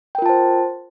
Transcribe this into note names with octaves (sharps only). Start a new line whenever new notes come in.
F4 A#4 C5 G5 A5